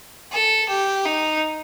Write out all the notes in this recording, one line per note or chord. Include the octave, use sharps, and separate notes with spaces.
A4
G4
D#4